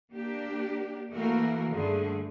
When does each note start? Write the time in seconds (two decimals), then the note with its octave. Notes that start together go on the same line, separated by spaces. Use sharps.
0.12 A#3 D4 G4
1.11 E3 A3 A#3 F#4 A#4
1.71 G2 D3 A3 G#4